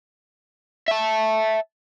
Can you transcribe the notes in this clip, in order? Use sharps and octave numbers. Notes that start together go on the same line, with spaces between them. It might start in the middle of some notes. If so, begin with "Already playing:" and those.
E5 A5